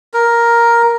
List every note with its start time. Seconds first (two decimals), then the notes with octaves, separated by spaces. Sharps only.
0.14 A#4